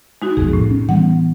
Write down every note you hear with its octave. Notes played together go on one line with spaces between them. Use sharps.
G#3 D#4 F#4
B1 F2 G#4
A2
C#4
E3 G3 B3 F#5